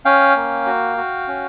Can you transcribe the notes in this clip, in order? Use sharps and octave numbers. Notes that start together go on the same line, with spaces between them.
C#4 F5 G5
A#3
F#4
F#4
C#4